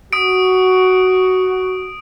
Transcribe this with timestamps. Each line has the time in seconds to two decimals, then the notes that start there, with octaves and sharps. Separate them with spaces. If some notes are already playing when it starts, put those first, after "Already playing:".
0.13 F#4 D#6 D7